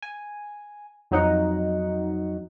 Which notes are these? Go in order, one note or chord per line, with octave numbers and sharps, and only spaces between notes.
G#5
F2 F#3 D#4 F#5